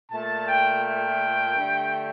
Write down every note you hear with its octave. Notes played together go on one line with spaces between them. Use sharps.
A#2 A3 A5
G5
G5
G2 D3 A3